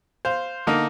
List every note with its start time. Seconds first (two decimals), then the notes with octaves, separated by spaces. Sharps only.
0.25 C5 F5
0.67 D3 A#3 D#4